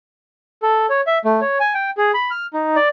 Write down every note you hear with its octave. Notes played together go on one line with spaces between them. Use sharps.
A4
C#5
E5
A3
C#5
G#5
G5
G#4
B5
F6
D#4
D5